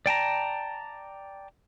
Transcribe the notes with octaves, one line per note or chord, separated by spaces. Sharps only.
D5 G5 A5 A#5